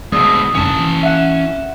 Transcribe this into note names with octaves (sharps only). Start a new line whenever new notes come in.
D2 B2 G#3 D#6 E6
F1 F#2 D3 C#4 A5
E3
E5 F#5 E7